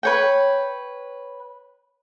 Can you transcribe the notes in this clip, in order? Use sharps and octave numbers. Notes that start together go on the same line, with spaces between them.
B4 C#5 G5